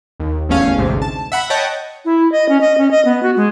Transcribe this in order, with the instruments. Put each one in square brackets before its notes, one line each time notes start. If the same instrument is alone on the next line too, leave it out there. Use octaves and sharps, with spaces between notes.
[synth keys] D#2
G1 E2 A3 C#4 F5
A1 D2 G#2 C3
A5
E5 F#5 B5
C#5 D#5 F#5 G5 A5 G6
[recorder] E4
D#5
C#4
D#5
C#4
D#5
B3
F#4
G#3